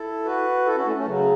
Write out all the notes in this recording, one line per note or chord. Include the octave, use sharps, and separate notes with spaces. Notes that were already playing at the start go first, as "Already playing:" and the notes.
Already playing: E4 A4
F#4 B4
E4 A4
C#4 F#4
A3 C#4
A3 C#4
C#3 F#3